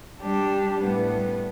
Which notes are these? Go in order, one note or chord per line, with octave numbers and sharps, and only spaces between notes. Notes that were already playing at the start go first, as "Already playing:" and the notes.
G3 D4 G4
A2 G3 B3